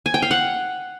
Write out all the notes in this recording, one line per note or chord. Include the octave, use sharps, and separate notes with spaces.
G#5
G5
F5
F#5